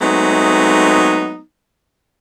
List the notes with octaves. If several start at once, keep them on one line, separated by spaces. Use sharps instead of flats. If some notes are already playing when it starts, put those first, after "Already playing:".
F#3 G#3 A3 B3 C4 D#4